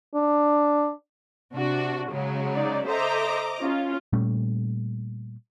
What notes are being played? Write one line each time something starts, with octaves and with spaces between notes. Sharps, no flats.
D4
C3 D4 F#4
C#3 F#3 G#3
D#4 D5
A4 C5 D#5 E5 A#5 D6
C#4 F4
A#2 G3 A3 C#4